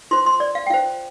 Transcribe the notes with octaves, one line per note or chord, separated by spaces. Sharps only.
F4 C5 C6
C6
D5
F5
G5
F4 C5 F5